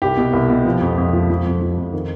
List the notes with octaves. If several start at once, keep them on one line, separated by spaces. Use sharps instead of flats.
C2 G4
B2
C2
B2
F3
F2
F2
F3
F3
F2
F3
F2
D#3